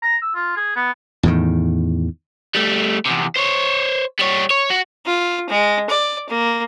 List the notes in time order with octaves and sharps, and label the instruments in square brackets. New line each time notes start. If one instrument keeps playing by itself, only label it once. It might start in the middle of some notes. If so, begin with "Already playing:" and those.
[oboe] A#5
E6
F4
G#4
B3
[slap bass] E2 A2 D#3
[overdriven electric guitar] G3 A3
E2 C3
C5 C#5
G3 C#5
C#5
F#4
[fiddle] F4
G#3
D5
A#3